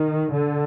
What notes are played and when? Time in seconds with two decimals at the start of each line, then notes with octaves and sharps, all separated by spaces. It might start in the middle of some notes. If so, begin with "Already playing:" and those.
Already playing: D#3
0.35 D3